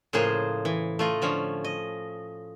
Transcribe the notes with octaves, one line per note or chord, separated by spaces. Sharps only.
A2 C#3 F3 A#3 G#4 C5
E3
A3 F4 D#5
D3 F3 C#4
D#5